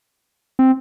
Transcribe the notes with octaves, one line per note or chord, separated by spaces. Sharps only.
C4